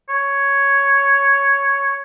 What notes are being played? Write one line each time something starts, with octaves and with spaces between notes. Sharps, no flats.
C#5